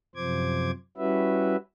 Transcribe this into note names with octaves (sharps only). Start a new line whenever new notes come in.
F#2 C3 F3 C5 D6 G#6
G3 C#4 E4 F#4 B4 E5